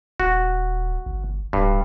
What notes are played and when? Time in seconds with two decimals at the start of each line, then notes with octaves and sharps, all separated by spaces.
0.20 D#1 F#4
1.06 G1
1.53 D1 G2